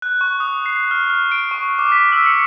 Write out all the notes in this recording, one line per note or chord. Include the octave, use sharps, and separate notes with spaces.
F#6
C#6
D#6
C7
F6
F6
D7
C#6
D6
B6
E6
C#7